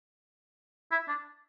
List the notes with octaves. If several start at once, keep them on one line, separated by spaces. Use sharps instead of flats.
E4
D4